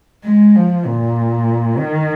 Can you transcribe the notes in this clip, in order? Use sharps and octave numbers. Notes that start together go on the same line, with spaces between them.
G#3
F3
A#2
D#3